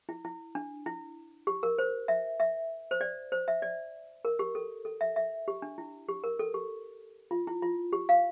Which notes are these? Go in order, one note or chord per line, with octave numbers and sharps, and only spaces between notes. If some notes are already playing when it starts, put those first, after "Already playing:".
E4
E4
D4
E4
G4
A#4
C5
E5
E5
C5
D5
C5
E5
D5
A#4
G4
A4
A4
E5
E5
G4
D4
E4
G4
A#4
A4
G4
F4
E4
F4
G4
F5